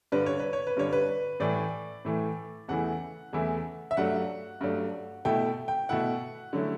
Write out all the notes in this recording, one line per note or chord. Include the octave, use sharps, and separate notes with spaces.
G2 D3 G3 D4 B4
C#5
B4
C#5
B4
G2 D3 G3 D4 C#5
B4
A2 E3 A3 D5
A2 E3 A3
E2 C#3 E3 A3 E4 F#5
E2 C#3 E3 A3 E4
E5
G2 F#3 A3 D4 F#5
G2 F#3 A3 D4
B2 A3 E4 G5
G5
B2 A3 E4 F#5
D3 F#3 A3 C#4 E4